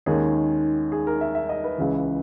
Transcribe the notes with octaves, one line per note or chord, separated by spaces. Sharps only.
D#2 D#3 G#3 C#4 G#4
G#4
A#4
E5
E5
D#5
B4
C#2 C#3 E3